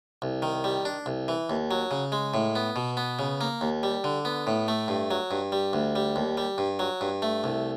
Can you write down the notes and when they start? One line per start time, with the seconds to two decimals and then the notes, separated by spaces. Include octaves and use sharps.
0.22 C2
0.42 D#3
0.64 G3
0.85 D4
1.06 C2
1.28 E3
1.50 D#2
1.71 F#3
1.91 C#3
2.12 G#3
2.34 A2
2.55 B3
2.76 B2
2.97 B3
3.19 C#3
3.41 A#3
3.61 D#2
3.83 G3
4.04 D3
4.25 B3
4.47 A2
4.68 A3
4.88 G2
5.11 F#3
5.31 G2
5.52 G3
5.73 D2
5.96 G3
6.16 D#2
6.37 G3
6.58 G2
6.79 F#3
7.01 G2
7.22 A3
7.44 C2